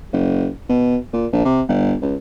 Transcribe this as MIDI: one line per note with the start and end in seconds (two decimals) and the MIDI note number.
0.13 0.48 30
0.69 0.96 47
1.13 1.27 46
1.33 1.41 34
1.45 1.62 48
1.69 1.95 31
2.02 2.15 37